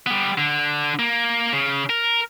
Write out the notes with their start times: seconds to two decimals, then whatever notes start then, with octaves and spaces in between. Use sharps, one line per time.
0.06 G3 B3
0.38 D3
0.99 A#3
1.53 C#3
1.90 A#4